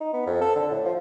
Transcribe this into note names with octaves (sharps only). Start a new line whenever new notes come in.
D#4
B3
F2
A4
D3
A2
F3